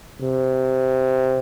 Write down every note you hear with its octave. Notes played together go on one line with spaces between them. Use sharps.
C3